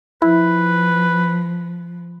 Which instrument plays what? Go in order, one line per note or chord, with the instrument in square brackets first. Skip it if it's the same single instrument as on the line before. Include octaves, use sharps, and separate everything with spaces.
[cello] F3 [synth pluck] E4 [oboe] B4